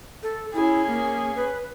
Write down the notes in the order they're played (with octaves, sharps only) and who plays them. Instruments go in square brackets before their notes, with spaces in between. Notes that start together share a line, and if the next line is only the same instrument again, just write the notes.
[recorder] A4
[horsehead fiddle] C#4 G#4 [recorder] E4
[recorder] A#3
B4